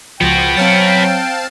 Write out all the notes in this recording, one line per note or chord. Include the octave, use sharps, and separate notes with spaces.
C#2 F3 B3 F#4 G5
F#3 C4 F5 A5